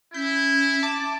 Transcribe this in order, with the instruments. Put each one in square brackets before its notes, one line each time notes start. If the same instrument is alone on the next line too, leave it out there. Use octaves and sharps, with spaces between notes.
[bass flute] C#4 [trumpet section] E4 [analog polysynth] G6
[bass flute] E5 [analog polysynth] A5 D6